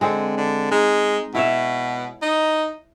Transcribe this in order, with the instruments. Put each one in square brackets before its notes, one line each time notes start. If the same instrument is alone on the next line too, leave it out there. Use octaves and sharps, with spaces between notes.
[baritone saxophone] D3 [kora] G#3 C4 G#4
[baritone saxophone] D3
[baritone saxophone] G#3 [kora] D#4
[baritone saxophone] B2 [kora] E4 C#5 E5
[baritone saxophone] D#4